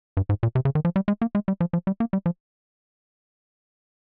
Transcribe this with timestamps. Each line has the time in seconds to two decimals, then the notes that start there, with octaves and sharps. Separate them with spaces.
0.17 G2
0.29 G#2
0.43 A#2
0.55 C3
0.65 C#3
0.75 D#3
0.85 F3
0.96 G3
1.08 G#3
1.22 A#3
1.35 G#3
1.48 G3
1.61 F3
1.73 F3
1.87 G3
2.00 A#3
2.13 G3
2.26 F3